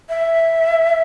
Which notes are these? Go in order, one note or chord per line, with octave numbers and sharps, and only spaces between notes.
E5